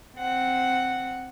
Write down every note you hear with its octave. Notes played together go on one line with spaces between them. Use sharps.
C4 F#5